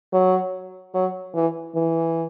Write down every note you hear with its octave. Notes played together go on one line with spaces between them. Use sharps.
F#3
F#3
E3
E3